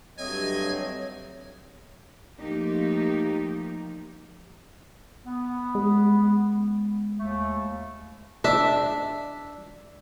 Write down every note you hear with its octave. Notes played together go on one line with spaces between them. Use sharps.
G2 D3 F#3 A3 C4 C#5 D#5 G#5
F3 A3 A#3 D#4 G4
B3
G#3
D#2 A3
D4 E5